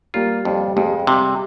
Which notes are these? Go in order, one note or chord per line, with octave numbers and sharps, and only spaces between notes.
G3 A#3 F4
F2 G3
F2 G#3
C3 G3